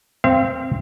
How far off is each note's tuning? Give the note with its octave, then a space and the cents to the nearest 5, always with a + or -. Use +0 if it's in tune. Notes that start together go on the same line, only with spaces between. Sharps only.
C4 +0 F5 -40